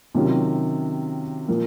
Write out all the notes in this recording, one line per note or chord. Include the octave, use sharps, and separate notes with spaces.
C3 D#3 F#3 C#4 F4
A#2 F3 A#3